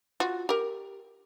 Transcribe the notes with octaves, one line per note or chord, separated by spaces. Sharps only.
F4 F#4
G4 A#4